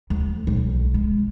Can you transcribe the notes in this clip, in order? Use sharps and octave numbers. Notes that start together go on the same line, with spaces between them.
D2
B1
G#3